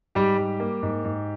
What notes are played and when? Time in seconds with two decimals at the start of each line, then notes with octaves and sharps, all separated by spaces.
0.15 G#2 G3 G4
0.38 G3
0.60 A#3
0.83 G#2
1.05 G#2